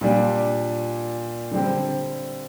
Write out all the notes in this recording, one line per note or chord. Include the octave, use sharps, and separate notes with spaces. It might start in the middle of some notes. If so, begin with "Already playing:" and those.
A#2 G3 D4
D3 G3 C4 G4